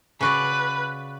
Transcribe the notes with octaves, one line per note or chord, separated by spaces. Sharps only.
C#3 F#4 B4 D5